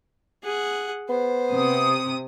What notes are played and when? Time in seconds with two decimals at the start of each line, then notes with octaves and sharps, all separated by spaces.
0.44 G#4 F#5
1.09 B3 C5
1.54 C3 D#6